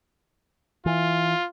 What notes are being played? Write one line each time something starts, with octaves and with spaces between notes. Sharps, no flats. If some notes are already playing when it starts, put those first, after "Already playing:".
E3 F4